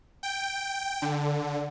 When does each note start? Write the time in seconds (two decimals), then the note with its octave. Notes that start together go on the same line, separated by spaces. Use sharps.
0.23 G5
1.02 D3